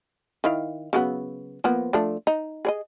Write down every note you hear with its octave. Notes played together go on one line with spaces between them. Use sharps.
D#3 E4 F5
C#3 F#3 B3
F3 A#3 B3
F3 A3 D4
D#4
G#4 D5 D#5